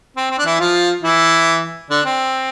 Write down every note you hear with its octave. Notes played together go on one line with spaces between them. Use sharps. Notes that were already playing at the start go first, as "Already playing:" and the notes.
C4
C4
D4
E3 E4
F3 F4
E3 E4
D3 D4
C4